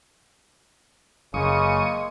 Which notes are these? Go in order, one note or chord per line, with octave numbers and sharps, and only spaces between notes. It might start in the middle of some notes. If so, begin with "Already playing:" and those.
F#1 C#3 G#3 A#3 C#6 D#6